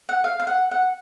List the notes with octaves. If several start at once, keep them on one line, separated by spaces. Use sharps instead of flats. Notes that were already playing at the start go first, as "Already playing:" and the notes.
F#5
F5
F5
F#5
F#5